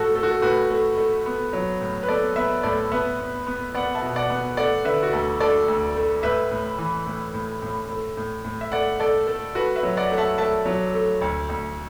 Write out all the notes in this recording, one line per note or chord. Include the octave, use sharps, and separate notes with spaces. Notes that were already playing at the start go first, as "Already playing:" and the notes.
Already playing: A2 A3 F#4 A4
A3 A4
F#4
A4
A2 F#4 B4
A3
A3
B3
F#3
A2
B4
B3 A4 D5
B3 B4 E5
A2 A4 D5
B3 B4 E5
B3
B3
B3 D5 F#5
E5 A5
B2
D5 F#5
B3
A3 D5 F#5
D3 B4 E5
F#4
D2 A4
A3 A4 D5
D2
A3
A2 B4 E5
A2
E3
A2
A2
A2
A3
A2
A2
E5
A3 D5 F#5
A3 A4 D5
A3 A4
A3 F#4 B4
B4 E5
F#3
D5 F#5
A3 F#5
E5 A5
A3 E5 A5
F#3
A3
D2
D2